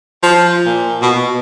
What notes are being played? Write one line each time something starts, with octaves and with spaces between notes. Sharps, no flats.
F3
A#2
B2